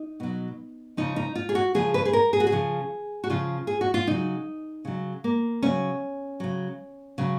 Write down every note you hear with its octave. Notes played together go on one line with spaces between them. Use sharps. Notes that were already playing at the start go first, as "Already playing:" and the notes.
Already playing: D#4
B2 F#3
C#3 F3 D#4
D#4
F4
G#4
F#4
C#3 F3 G#4
B4
G#4
A#4
G#4
F#4
G#4
C#3 F3
F#4
C#3 F3 F4
G#4
F#4
F4
C#3 F#3 D#4
C#3 F#3
A#3
C#3 F#3 C#4
C#3 F#3
C#3 F#3